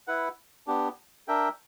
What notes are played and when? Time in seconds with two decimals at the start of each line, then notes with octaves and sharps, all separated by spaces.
0.08 E4 B4 F#5
0.67 B3 D4 G4
1.28 D4 A#4 E5 G5